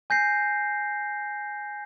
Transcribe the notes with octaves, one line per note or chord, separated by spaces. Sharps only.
G#5 G6 A#6 C7